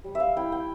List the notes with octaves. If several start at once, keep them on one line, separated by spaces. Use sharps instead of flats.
G3
E5
F5
E4 G5
G5